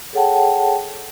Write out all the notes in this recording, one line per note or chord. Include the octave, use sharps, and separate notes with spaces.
G#4 A4 C#5 F#5 G5 A5